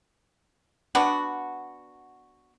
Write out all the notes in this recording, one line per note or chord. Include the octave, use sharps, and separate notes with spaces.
B3 D4 F#4